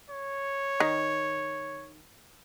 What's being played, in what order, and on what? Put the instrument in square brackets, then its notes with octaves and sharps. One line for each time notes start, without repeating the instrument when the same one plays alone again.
[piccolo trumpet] C#5
[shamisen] D#3